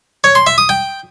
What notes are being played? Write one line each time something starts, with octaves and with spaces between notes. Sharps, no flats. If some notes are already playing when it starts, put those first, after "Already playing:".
C#5
C6
E5
D#6
G5